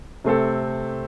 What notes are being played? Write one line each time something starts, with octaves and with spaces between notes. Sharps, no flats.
C3 A3 C4 A4